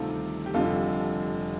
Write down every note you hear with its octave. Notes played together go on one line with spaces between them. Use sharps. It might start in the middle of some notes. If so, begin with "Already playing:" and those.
Already playing: D2 C3 D#3 G3 F4 A4
G4
F1 F2 D3 G3 F4 A4